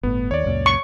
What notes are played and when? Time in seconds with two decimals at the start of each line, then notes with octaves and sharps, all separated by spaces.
0.03 G1 A2 B3
0.31 D#2 C#5 D5
0.46 C#2 F#2 A#2
0.66 C#6